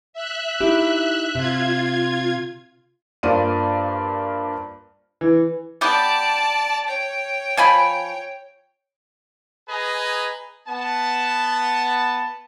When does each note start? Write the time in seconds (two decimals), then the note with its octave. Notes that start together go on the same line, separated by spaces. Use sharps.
0.13 E5 F#6
0.61 D#4 E4 G4
1.35 C3 F4 G#6
3.23 G2 A#3 F4 C5 D5 D#7
5.21 E3
5.81 B3 G4 D5 A5
6.88 C#5 G5
7.57 F3 G#5 B5
9.69 G#4 B4 D#5 G#5 A#5
10.67 B3 A5